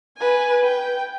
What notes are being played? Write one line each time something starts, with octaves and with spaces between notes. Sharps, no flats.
B4 G#5
G5